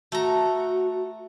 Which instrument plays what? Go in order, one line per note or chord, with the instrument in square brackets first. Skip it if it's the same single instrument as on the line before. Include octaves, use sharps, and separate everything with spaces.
[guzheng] A3 A#5 [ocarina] F#4